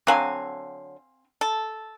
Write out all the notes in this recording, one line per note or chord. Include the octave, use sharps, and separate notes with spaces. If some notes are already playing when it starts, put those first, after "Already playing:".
D3 F#3 C4 F5 G#5
A4